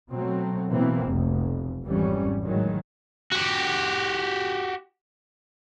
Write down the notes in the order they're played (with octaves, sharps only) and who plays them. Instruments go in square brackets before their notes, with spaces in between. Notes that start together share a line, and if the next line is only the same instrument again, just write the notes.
[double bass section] B2 F#3 A3 C4
B2 E3 A#3 C4
F1 B1
G#1 F2 G#2 E3 G3 C#4
A2 D#3 F#3 G#3
[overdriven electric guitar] F#4 G4